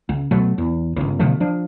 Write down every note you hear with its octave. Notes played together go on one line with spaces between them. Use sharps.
C#2
B2 F#3 A3
E2
G1 C#2
B2 D3 F3 A3
F3 D4